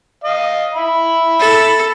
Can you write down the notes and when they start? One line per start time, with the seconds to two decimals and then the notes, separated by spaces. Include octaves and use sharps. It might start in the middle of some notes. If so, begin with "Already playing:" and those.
0.24 D#5 F5
0.74 E5 B5
1.40 A4